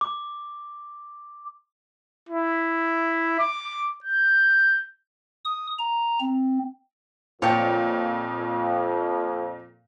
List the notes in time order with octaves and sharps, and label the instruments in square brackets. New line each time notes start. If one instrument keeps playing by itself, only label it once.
[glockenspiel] D6
[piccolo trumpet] E4
D6
G6
[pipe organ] D#6
A#5
C4
[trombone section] F2 [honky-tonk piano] A#2 [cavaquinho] C#5 G5 A5